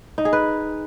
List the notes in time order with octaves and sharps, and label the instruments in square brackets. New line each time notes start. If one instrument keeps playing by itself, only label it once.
[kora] D#4
G#4
B4